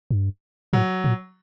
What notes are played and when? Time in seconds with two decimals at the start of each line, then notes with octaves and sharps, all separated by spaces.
0.11 G2
0.73 A2 F#3
1.04 A#2